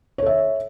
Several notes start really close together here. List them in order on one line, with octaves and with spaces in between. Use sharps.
C#5 A4 E5